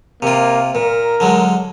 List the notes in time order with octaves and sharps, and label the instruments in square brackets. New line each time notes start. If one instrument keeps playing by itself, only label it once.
[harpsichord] C3 F4 [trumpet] A#3
[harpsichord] A#2 [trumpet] A#4
[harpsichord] D3 F#3 G#3